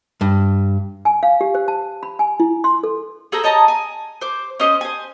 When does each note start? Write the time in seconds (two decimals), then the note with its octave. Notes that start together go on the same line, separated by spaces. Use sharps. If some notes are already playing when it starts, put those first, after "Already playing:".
0.21 G2
1.05 G#5
1.23 F5
1.41 G4
1.55 C5
1.68 A5
2.03 B5
2.19 G#5
2.40 E4
2.64 C6
2.83 A4
3.32 G#4 A4 C5 A#5
3.43 C#5 D#5 A5 A#5
3.68 G#5
4.21 C5 D6
4.60 C#4 C5 D#5 C6
4.81 C5 G#5